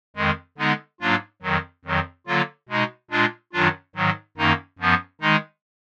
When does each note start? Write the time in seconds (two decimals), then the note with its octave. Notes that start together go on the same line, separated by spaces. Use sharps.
0.16 F2 D#3 G#3
0.58 D3 G#3 B3 D#4
1.01 G#2 F#3 A#3 D4 F4
1.42 F2 D#3 F#3
1.85 F2 D#3 F#3
2.27 D3 F#3 A#3 F4
2.69 B2 G#3 D#4
3.11 A#2 G#3 D4 F4
3.53 F#2 D#3 F#3 D4 F4
3.95 G#2 D#3 F#3
4.37 F#2 D#3 A#3 D#4
4.79 F#2 F3 B3
5.21 D#3 G#3 D#4